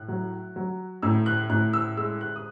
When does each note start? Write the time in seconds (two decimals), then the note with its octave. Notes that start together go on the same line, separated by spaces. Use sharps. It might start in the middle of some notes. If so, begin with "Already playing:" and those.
Already playing: A2 F#6
0.08 F#3
0.56 F#3
1.02 A2 E6
1.26 F#6
1.50 A2 F#6
1.73 E6
1.97 G#3 E6
2.21 F#6
2.36 D#6